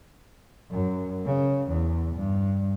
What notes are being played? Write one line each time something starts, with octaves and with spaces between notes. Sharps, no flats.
F#2
C#3
E2
G2